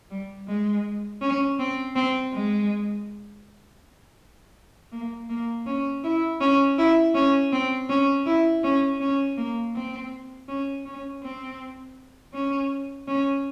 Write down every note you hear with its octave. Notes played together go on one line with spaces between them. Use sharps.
G3
G#3
C#4
C4
C4
G#3
A#3
A#3
C#4
E4
C#4
E4
C#4
C4
C#4
E4
C#4
C#4
A#3
C4
C#4
C#4
C4
C#4
C#4